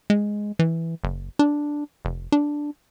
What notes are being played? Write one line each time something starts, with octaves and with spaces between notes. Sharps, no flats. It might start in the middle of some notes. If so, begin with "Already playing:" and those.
G#3
E3
F#1
D4
F1
D4